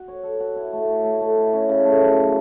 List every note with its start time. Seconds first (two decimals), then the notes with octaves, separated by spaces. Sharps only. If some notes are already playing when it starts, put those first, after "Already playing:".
Already playing: F#4
0.08 C#5
0.23 A4
0.40 F#4
0.56 E4
0.73 A3
0.88 C#5
1.04 A3
1.21 A3
1.37 E4
1.53 C#4
1.69 C#3
1.85 A3
2.01 F#2
2.18 C#4